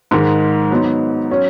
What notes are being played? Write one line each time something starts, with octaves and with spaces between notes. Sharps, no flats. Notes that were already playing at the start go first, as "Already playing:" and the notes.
G#2 D#3 G#3
F#3 B3 D#4
F#3 C#4